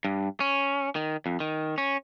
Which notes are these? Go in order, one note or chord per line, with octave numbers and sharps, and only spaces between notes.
G2
C#4
D#3
F2
D#3
C#4